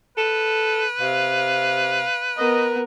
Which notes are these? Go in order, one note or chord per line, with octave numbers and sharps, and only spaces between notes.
A4 B4
C3 F5
B3 A#4 D#5